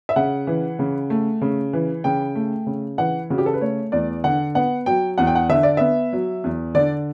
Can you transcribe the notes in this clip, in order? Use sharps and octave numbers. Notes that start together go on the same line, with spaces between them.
E5
C#3 F#5
E3
C#3
A3
C#3
E3
C#3 G5
A3
C#3
E3 F#5
C#3 F#4
G4
A4
B4
A3 C#5
E2 D5
D3 F#5
B3 F#5
F#3 G5
E2 F#5
G5
F#5
D3 E5
D5
B3 E5
F#3
E2
D3 D5